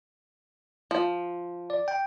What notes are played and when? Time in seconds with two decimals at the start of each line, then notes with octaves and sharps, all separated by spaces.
0.91 F3
1.70 D5
1.88 G5